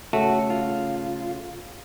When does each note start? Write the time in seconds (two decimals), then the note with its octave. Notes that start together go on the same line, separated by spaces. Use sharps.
0.13 C#3 A3 F#4
0.50 F4